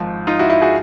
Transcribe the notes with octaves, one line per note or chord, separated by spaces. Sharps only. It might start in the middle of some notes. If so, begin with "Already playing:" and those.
Already playing: G#1 G#2 F3
D#4 F4
E4 F#4
E4 F#4
F#4 G#4